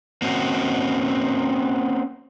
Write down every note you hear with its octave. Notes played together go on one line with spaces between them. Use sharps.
A#3 C4 C#4 F#4